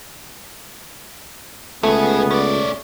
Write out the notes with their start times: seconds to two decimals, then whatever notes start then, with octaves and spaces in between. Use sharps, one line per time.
1.83 C#2 C#3 A3 B3 G#4
2.31 C#4 D5